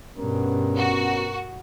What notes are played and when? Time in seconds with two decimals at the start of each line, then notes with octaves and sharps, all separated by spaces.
0.18 G2 B2 B3 C#4 A#4
0.75 F#4